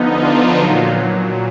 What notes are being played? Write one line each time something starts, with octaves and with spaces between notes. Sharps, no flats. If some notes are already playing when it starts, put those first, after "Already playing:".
Already playing: D3 F3 B3 D#4
D4 F4
A#2 F#3